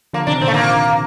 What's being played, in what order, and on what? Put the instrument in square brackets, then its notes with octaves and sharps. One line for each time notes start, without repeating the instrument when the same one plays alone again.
[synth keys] D3 F3 [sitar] A#3
[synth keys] C3 D#3 [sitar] D4
[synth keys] A#2 D3 [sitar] C4
[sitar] A3
A#3